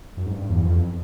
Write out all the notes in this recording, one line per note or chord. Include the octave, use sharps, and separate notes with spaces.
F#2
G#2
G2
E2
F2